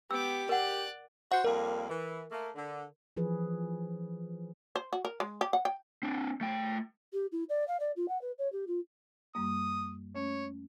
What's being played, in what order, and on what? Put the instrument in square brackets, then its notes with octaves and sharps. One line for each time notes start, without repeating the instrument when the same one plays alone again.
[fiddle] B3 D6 [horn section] G4 [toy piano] E6
[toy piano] A#4 F#5 [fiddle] D5 F#6
[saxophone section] F#4 C5 [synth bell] F#5
[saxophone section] F2 G3 A#3 [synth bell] A#4
[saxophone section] E3
A3 A#3
D3
[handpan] E3 F3 G#4 B4
[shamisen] C5
F#4
A#4
G#3
G4
F#5
G5
[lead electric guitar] C4 D4
A3 G5
[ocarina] G4
E4
D5
F5
D5
F4
F#5
B4
C#5
G4
F4
[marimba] F#2 G3 A#3 [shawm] D#6
[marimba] A3 C#4 [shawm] C#5